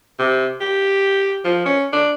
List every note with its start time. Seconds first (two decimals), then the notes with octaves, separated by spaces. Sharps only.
0.19 C3
0.60 G4
1.44 F3
1.65 C#4
1.93 D4